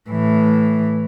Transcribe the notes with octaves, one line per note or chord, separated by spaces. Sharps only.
A2 E3